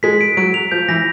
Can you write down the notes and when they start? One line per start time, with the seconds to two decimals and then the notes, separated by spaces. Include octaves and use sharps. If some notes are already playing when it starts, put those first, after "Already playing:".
0.03 G#3 B6
0.21 D7
0.37 F#3 D7
0.54 F7
0.72 F3 G6
0.88 E3 A#6